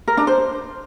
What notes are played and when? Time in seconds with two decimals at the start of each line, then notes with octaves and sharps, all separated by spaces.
0.08 A#4
0.17 D4
0.27 C5